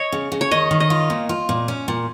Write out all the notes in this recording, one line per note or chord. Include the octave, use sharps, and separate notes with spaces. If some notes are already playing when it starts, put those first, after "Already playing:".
Already playing: C#5 D#5
C#3
C#3
C#5
D#3 D#5
D#3
D#5
F4
A#2
F4
A#2
C#4
A#2